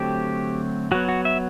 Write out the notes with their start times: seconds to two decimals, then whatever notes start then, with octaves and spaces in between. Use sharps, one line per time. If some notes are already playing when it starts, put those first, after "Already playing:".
Already playing: D3 F#3 A3 C4 G4
0.92 F#3 B3 F#4
1.09 F#4
1.25 E5